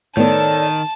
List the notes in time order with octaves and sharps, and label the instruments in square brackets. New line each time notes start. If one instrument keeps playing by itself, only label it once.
[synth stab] A2 B3 [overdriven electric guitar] D#3 [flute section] A4 C#5 D5 [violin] A5